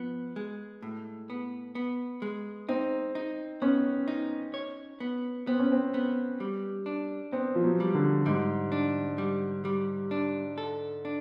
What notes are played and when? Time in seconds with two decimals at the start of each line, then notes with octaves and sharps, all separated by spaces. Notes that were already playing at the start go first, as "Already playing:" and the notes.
Already playing: F3 B3
0.36 G#3
0.82 A2
1.30 B3
1.75 B3
2.22 G#3
2.69 C4 D#4
3.15 D#4
3.62 B3 C#4
4.08 D#4
4.54 C#5
5.00 B3
5.47 B3 C4
5.59 C#4
5.72 C4
5.94 B3
6.40 G3
6.86 D4
7.32 B3 C4
7.55 F3
7.64 F#3
7.80 G3
7.94 D3
8.26 G#2 G3
8.72 D4
9.18 G3
9.65 G3
10.11 D4
10.58 A4
11.05 D4